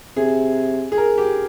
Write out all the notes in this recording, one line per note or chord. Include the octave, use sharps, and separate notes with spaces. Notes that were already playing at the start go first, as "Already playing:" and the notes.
C3 G#4
G#4
A#4
G4